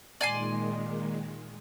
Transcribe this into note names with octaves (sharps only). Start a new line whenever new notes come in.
A#2 D#3 G#3 D5 G#5 C6